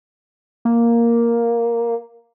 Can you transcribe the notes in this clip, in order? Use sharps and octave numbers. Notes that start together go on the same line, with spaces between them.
A#3